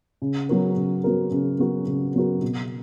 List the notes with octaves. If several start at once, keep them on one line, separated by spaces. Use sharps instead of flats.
C#3
F#3 B3 F#4 A#4
C#3
F#3 B3 F#4 A#4
C#3
F#3 B3 F#4 A#4
C#3
F#3 B3 F#4 A#4
B2